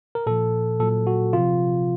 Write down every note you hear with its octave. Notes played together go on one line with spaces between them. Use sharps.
A#4
A#2 F3 A4
A#2 F#3 A4
F#4
C3 F3 F4